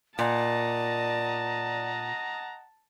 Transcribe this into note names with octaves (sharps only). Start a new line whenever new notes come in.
A#2 D5 D#5 F#5 A5 A#5